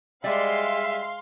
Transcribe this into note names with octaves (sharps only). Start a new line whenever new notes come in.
G3 G#3 D5 E5 F5 C6